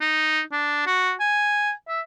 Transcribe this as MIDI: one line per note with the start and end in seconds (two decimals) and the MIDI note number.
0.01 0.41 63
0.52 0.83 62
0.86 1.12 66
1.20 1.71 80
1.88 2.01 76